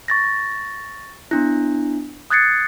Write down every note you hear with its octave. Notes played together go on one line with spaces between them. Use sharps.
C#6 A6 A#6
B3 D4 E4
D#6 F#6 G#6 A6 C7 C#7